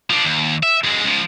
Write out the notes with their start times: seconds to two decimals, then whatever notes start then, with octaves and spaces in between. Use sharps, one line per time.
0.10 F3 D4
0.25 D#2
0.63 E5
0.84 F#2 G#3
1.04 C#2 F3